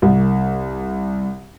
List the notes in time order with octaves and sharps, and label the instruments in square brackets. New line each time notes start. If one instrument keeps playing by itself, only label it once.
[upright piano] C2